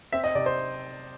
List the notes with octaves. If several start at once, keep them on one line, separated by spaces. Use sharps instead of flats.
C4 E5
D#5
C3 D5
C5